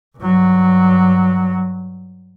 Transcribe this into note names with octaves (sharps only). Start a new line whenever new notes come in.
G2 F#3